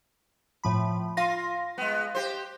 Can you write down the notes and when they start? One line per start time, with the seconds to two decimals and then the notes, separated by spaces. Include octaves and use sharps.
0.64 A2 F3 B5
1.17 F4 F5 C6 A#6
1.78 G#3 B3
2.15 G4 C5